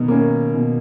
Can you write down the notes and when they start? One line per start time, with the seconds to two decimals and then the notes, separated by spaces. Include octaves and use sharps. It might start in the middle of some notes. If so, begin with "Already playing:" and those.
Already playing: B2 D#3
0.08 A#3 C#4
0.55 B2